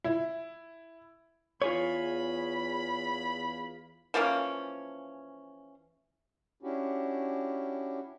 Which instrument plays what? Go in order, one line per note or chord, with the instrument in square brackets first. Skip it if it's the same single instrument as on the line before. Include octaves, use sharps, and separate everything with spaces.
[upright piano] E4
[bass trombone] E2 [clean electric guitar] F4 G#4 C#5 [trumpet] B5
[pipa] E3 F3 A#3 C#4
[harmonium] C#4 D4 E4 F#4 G4